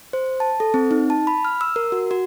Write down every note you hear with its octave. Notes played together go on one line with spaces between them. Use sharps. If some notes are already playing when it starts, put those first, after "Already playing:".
C5
A5
A4
C4
D#4
A5
B5
F6
E6
A#4
F#4
F#4